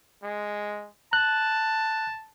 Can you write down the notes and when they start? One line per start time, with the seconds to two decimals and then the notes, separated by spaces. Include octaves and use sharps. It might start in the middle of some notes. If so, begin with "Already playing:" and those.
0.23 G#3
1.13 A5 F#6